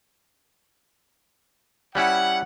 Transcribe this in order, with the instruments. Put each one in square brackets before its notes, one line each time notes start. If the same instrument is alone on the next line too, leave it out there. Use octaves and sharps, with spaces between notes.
[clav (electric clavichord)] G3 C#4 E4 [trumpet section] F#5